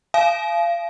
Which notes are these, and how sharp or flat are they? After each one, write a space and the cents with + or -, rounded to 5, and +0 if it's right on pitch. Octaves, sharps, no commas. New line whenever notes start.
F5 -30 G#5 +45